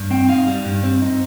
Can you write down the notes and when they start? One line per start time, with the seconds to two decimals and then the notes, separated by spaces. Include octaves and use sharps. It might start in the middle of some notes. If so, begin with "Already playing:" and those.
Already playing: G2
0.11 C4 G5
0.29 D#4 F5
0.47 G3
0.65 G2
0.83 C4
1.02 D#4